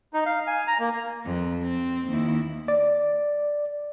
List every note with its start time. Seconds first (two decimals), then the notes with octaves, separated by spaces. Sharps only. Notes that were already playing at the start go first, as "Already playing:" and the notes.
0.14 D#4
0.26 F5
0.47 G#5
0.67 A#5
0.80 A#3
1.26 F2
1.63 C4
2.09 D#2 E4
2.68 D5